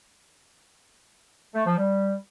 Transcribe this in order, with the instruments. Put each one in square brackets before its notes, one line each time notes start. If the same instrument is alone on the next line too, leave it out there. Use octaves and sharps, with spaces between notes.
[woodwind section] A3
F3
G3